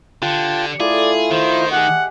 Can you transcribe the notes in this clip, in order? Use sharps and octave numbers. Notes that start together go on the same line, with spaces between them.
D3 F4 G4 G5 A5
A3 E4 F4 G#4 D5
D#3 C5 D#5
G4 G#4 F#5